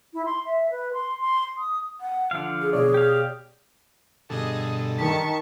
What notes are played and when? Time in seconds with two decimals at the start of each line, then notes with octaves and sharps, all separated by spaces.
0.14 E4
0.26 C6
0.45 E5
0.70 B4
0.94 C6
1.20 C6
1.58 D#6
2.01 F#5
2.31 D3 F3 F5
2.61 G#4
2.73 B2 G#4 C#5 D5
2.94 G4 F5
4.30 G2 B2 D3 G#4 A4 D#5
4.98 D#3 A5 C#6 B6